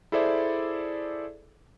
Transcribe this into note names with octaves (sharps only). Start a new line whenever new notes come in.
E4 G#4 A4 C5 D5 E5